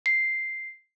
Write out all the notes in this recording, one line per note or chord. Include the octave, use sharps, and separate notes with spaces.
C7